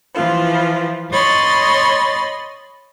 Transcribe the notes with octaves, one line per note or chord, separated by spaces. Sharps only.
E3 F3 F4
C#5 D#5 B5 C6 A6